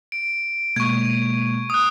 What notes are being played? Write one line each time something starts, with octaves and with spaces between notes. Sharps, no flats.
D7
B2 G#3 A#3 C#6 G#6
D#6 F#6